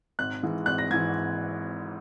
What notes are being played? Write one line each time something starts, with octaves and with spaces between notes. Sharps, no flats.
G#1 F#6
G#2 E3
G#1 F#6
A#6
G#2 E3 G#6